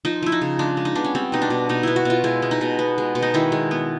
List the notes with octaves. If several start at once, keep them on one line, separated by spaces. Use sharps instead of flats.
F3 D#4
F3 E4
D#4
C#3
G#3 D4
G#3
D#4
B3 D4
C#4
G3 C4
B2 D#4
D4
B2
B2 D#4
B3 E4
F#4
B2 F4
G#3 E4
G#3
D#4
B2
B3
G#3
B2
D#4
D#3 E4
G#3
B3